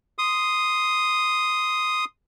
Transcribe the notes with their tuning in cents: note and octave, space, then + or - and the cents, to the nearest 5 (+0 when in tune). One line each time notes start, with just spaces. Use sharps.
C6 -5 D#6 +0